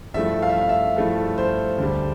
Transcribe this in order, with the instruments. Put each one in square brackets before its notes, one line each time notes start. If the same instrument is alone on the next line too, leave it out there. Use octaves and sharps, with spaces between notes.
[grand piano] G2 F3 A3 E4 E5
F5
E5
F5
E5
G2 F3 A3 E4
C5
D2 D3 G3